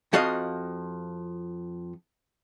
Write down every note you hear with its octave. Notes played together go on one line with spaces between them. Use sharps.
F2 F3 F#4 D#5 F5